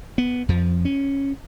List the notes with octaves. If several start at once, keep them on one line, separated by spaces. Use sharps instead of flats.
B3
F2 F3
C#4